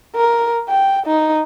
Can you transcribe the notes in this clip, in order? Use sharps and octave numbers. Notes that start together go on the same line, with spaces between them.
A#4
G5
D#4